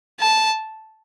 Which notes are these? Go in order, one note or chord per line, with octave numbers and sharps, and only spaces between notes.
A5